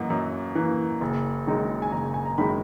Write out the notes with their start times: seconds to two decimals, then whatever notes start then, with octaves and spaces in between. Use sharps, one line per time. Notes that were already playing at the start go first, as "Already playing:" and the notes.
Already playing: F#2 E3 A#3 D#5 F#5
0.10 F#2
0.55 E3 A#3
1.01 F#1
1.47 F#2 D#3 G#3 D#4
1.82 G#5
1.92 F#1 A#5
2.14 G#5
2.25 A#5
2.38 F#2 D#3 G#3 D#4 B5